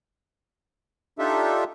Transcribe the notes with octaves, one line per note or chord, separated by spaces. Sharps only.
D4 D#4 F4 G4 A4 E5